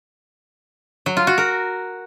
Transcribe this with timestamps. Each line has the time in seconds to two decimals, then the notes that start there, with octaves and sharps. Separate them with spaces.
1.06 F#3
1.17 F4
1.27 F#4
1.38 A#4